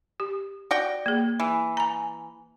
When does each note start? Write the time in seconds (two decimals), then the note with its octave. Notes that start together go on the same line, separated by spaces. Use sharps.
0.20 G4
0.71 F#4 D5 G5
1.06 A#3 G#4
1.40 E3
1.77 G#5 A#5